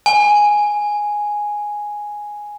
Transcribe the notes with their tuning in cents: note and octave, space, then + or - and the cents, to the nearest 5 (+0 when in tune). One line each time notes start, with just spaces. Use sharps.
G#5 +0